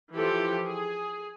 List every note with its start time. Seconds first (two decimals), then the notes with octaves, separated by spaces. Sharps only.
0.15 E3 F3 G4 A4
0.65 G#4